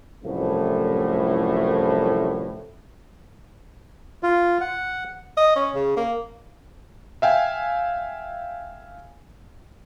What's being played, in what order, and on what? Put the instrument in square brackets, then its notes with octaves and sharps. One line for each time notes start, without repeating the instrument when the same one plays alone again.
[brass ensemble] C2 F#2 A2 E3 F3 A3
[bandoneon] F4
F#5
[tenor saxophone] D#5
C#4
C#3
A#3
[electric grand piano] E5 F5 G5 G#5